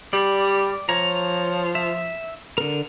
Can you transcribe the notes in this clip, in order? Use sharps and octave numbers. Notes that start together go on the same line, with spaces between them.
G3 D5
F3 C#5 A#5
E5
D3 A#4